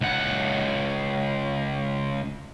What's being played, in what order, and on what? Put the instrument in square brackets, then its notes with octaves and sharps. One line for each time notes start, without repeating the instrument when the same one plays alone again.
[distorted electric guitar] C#2 F#5